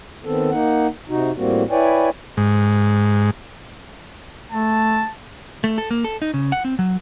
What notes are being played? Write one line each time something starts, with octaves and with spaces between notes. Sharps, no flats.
D#3 B3 C4 A4
A#3 D#4 F#5
C3 D#4 F#4
A2 G3 A#3 C4 F#4
E4 B4 C#5 D5 G5 G#5
G#2
A3 A5
A3
A4
A#3
A4
D#4
C#3
F#5
C4
F#3